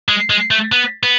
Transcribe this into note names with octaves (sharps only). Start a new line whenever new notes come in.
G#3
G#3
A3
B3
B3